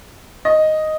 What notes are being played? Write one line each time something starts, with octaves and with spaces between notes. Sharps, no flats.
D#5